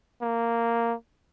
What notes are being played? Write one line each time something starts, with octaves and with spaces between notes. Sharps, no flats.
A#3